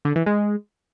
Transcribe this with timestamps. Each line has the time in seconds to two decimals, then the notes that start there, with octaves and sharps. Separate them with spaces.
0.05 D3
0.16 E3
0.26 G#3